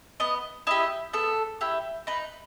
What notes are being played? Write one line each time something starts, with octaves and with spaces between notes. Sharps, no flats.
B3 D#5
E4 G4 D#5
B3 A4
E4 G4
D#4 B4